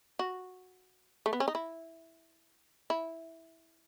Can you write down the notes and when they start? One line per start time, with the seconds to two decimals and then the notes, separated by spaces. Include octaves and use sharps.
0.19 F#4
1.26 A3
1.33 B3
1.40 C#4
1.48 D#4
1.55 E4
2.90 E4